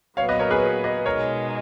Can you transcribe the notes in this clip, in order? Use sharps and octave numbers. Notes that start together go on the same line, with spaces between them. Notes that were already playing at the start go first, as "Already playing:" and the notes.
A#2 F#3 B3 C#5 F5
B4 D#5
A#4 C#5
G#4 B4
B4 D#5
B2 G#3 D#4 A#4 C#5